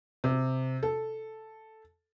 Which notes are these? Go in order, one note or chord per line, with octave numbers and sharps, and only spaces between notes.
C3
A4